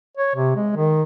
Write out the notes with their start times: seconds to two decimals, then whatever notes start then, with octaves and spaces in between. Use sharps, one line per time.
0.17 C#5
0.35 C3
0.56 G#3
0.76 D#3